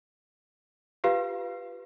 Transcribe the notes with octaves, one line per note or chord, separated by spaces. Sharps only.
F4 G4 B4 F5